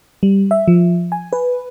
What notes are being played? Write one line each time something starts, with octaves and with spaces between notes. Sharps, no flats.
G3
E5
F3
G#5
B4